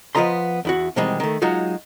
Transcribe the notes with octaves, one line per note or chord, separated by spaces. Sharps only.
F3 B3 F4 D#5 A#5 C6
E2 E4 F#4
B2 D#3 E3 G3 G#3 C4
D#3 A3
F#3 G#3 D#4 F4 F#4